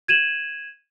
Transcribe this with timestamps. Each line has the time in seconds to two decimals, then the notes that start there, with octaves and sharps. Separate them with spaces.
0.08 G#6 D#7 E7 F#7